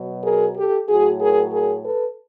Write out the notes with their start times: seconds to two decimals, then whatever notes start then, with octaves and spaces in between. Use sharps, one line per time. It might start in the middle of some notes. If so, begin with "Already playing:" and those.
Already playing: B2 F#3
0.24 G#4 A#4
0.57 G4 A4
0.89 A2 F#3 F#4 G#4
1.20 G#4 A#4
1.52 G#4 A#4
1.85 A4 B4